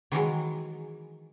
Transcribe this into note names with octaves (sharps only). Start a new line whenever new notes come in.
D#3 E3 F#3 G#3